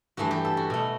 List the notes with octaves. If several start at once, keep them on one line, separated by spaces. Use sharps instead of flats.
G2 E3 A3 F#4
G4
A4
F#4
B2 A3